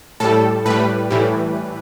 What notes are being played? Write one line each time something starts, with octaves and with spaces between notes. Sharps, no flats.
A2 G3 A4
A2 G3 B4
A2 E3 G3